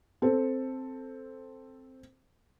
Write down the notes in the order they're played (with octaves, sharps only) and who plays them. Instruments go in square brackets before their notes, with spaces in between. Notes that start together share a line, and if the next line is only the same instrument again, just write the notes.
[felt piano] C4 A4